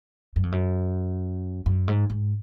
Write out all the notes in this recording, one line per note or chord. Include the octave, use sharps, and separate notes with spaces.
F#2
F2
F#2
F#2
G#2
G#2